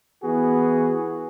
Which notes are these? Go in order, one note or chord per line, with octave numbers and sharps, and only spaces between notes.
E3 B3 F#4 G#4